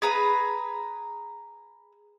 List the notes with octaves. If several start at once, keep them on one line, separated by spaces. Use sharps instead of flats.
G#4 B4 A#5 B5